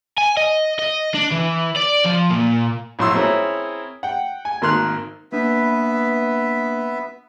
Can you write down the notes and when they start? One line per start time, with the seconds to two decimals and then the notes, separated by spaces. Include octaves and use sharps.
0.18 G#5
0.37 D#5
0.79 D#5
1.14 D4
1.32 E3
1.76 D5
2.05 F3
2.31 A#2
2.99 A#1 F2 A2 F#3 C6 E6
3.15 C4 C#4 E4 G#4 A#4 C#5
4.03 F#5 G5
4.45 G#5
4.62 G#1 D#3 A#3 C6 F6 F#6
5.32 A#3 B3 D4 B4 E5